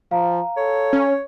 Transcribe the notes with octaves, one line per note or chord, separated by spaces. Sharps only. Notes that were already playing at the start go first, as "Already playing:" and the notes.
F3 F5 A#5
A4 C#5
C#4